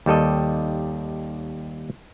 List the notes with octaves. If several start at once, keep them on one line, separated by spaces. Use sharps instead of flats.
D#2 G3 A4 D#5